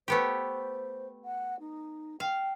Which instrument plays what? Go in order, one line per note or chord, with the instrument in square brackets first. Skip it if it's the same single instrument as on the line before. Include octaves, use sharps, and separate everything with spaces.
[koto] A3 B3 G4 [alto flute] C5
[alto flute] F#5
D#4
[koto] F5 [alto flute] G5